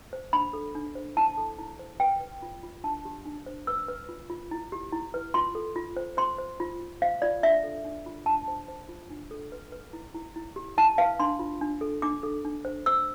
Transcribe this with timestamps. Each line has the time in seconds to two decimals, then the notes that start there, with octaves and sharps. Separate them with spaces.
0.13 C5
0.33 D4 B5
0.53 A4
0.75 D4
0.95 C5
1.17 E4 A5
1.38 A4
1.58 E4
1.79 C5
2.00 B4 G5
2.21 B4
2.42 F4
2.63 F4
2.84 D4 A5
3.05 G4
3.25 D4
3.46 C5
3.67 B4 E6
3.88 B4
4.09 F4
4.30 F4
4.51 E4
4.72 G4
4.92 E4
5.14 B4
5.34 F4 C6
5.55 A4
5.76 F4
5.97 C5
6.17 C5 C6
6.38 C5
6.60 F4
6.80 F4
7.02 C5 F5
7.22 F4 D5
7.43 D4 E5
7.64 A4
7.85 D4
8.06 F4
8.26 D4 A5
8.48 C5
8.68 C5
8.89 F4
9.10 D4
9.31 A4
9.52 B4
9.72 B4
9.93 E4
10.14 E4
10.36 E4
10.56 G4
10.77 E4 A5
10.98 B4 F5
11.20 D4 C6
11.39 F4
11.61 D4
11.81 A4
12.02 D4 D6
12.23 A4
12.45 D4
12.65 C5
12.86 C5 E6